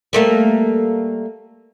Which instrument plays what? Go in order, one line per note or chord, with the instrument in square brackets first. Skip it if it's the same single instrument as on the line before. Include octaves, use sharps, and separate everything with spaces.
[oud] G3 A3 A#3